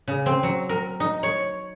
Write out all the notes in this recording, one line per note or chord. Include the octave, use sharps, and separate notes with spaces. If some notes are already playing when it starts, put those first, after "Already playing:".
C#3
C4
F#3
A#4
D#4
C#5